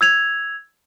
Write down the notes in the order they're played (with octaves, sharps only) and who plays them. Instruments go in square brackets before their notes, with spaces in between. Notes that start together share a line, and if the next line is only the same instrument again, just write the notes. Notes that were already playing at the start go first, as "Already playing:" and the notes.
[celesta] E6 G#6 F7